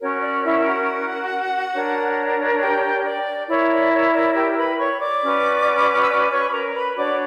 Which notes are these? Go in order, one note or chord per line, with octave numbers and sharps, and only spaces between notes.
C#4 F#4 A#4 C#5
D5
E4 E5
F#4 F#5
D4 A#4 C#5
G4 G5
D5
E4 A#4 C#5 D5
D5
C#5
D5
G4 G5
B4 B5
C#5 C#6
D5 D6
C#4 F#4 B4
E6
D5 D6
C#5 C#6
B5
A#4 A#5
B4 B5
D4 F#4 C#5 D5 D6